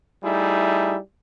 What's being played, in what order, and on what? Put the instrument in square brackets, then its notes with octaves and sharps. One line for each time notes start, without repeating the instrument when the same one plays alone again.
[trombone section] G3 A3 D#4 E4 G#4